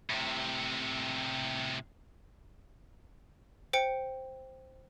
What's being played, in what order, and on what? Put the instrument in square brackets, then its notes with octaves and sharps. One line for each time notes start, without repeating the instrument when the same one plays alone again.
[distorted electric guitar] A2 C3
[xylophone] C5 G5 C#7